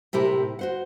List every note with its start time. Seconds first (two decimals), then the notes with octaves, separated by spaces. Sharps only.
0.13 A2 C3 E4 G4 A#4
0.59 F#4 C5 F#5